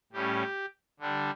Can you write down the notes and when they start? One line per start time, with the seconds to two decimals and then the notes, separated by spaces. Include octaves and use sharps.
0.12 A2 G3 C#4 G4
1.00 D3 G3 D4